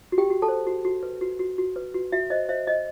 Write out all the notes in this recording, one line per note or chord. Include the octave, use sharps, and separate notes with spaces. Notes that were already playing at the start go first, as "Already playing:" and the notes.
F#4
G4 G5
F#4
A4 A5
C5
F#4
F#4
B4
F#4
F#4
F#4
B4
F#4
F#4 E5
C5 D#5
C5 E5
C5 D#5